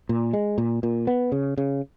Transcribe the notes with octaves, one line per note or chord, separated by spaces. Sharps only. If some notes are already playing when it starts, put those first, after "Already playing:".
A#2
G#3
A#2
A#2
B3
C#3
C#3